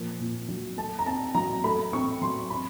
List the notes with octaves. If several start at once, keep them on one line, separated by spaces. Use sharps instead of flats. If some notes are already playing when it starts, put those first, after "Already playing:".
Already playing: A#2 F3 A#3
A#2
F#3
A3 A5
A#5
C4 A5
F#3 A#5
A3 B5
C4 C#6
F#3 C6
C4 B5